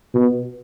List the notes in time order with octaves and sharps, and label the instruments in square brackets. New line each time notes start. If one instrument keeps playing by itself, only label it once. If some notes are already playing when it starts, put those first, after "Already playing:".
[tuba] B2